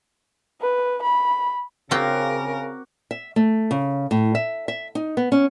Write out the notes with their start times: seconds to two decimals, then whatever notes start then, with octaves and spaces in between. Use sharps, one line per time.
0.61 B4
1.02 B5
1.91 C#3 C4 F4 F#4 A#4 D6
3.11 E5
3.36 A3
3.71 C#3
4.11 A2
4.35 E5
4.68 E5
4.95 D#4
5.17 B3
5.32 C#4